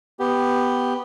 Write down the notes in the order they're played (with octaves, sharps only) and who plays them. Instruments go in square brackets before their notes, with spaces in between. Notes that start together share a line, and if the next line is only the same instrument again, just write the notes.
[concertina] B3 G4